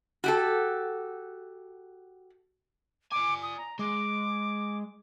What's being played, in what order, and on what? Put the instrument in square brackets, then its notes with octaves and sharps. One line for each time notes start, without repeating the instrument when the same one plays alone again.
[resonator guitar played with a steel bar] F#4 G4 A4
[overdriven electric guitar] D5 G#5 [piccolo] D6
[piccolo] D#6
A#5
[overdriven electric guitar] G#3 [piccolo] D6